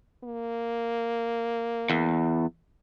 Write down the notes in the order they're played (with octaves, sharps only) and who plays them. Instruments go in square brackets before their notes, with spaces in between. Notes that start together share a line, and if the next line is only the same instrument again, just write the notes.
[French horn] A#3
[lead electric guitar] E2